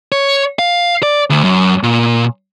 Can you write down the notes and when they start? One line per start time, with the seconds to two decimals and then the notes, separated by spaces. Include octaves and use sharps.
0.12 C#5
0.59 F5
1.03 D5
1.30 D2
1.43 F#2
1.83 A#2